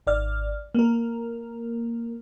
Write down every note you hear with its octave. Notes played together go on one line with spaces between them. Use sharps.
G#1 D5 F6
A#3 A#4